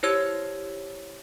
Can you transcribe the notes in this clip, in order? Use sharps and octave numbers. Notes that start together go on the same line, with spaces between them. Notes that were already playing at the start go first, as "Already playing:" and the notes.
E4 G4 C5 C#5 E6 G#6